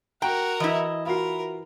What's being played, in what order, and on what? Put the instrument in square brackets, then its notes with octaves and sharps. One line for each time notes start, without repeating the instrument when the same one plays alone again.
[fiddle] F#4 A#4 [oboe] F#5 [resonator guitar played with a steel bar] G5 [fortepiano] A#5
[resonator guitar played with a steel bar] E3 E4 [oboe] D#5
[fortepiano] F4 F#4 F5 [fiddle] A#4 [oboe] B5